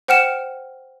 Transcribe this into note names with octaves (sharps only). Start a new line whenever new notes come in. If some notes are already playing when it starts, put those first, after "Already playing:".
C5 F#5 G5 F6 C#7 E7